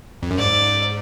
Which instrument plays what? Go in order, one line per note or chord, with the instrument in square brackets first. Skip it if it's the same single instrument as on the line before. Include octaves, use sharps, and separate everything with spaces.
[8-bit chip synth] F2
F#2
[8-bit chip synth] G#2 [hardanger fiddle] D5